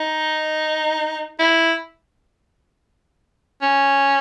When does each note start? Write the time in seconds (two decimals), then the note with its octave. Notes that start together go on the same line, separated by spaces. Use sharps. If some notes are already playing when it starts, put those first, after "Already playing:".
Already playing: D#4
1.39 E4
3.62 C#4